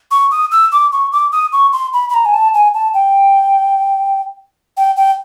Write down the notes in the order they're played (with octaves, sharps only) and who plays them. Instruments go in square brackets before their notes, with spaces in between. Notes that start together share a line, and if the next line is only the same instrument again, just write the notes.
[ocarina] C#6
D#6
E6
D6
C#6
D6
D#6
C#6
C6
B5
B5
A#5
G#5
A5
G#5
A5
G5
G5
G5